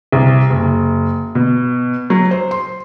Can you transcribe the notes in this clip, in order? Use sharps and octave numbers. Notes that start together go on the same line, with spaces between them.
C2
F#1
B2
F#3
C5
C6